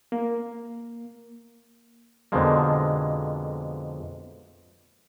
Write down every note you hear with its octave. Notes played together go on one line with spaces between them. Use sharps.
A#3
F2 B2 D3 F3 G#3 A#3